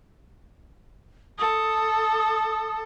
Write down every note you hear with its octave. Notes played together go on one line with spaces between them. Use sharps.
A4 D#6